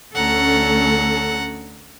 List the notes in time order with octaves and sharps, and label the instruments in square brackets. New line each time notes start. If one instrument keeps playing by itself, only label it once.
[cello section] D2 C#4 A4 [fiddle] F#5 A#5